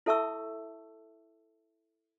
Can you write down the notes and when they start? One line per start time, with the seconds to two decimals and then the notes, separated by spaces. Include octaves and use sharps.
0.06 E4 A4 E5 A5 C#6 E6